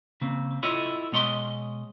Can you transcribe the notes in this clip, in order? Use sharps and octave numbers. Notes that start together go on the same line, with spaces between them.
C#3 A#3 C4
E4 F4 A4 C#5 D#5
B2 G#3 C#5 D#5 A#5 C6